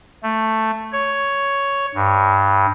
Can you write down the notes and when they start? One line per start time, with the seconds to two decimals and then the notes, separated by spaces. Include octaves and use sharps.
0.23 A3
0.92 C#5
1.95 G2